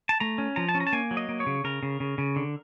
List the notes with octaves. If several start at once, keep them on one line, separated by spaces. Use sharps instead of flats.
A5
A3 A#5
C#4
F3 A#5
A5
C#4
A#5
A5
A#3 G#5
F#3
D#5
A#3
C#5
C#3
C#3 A#4
C#3
C#3
C#3
D3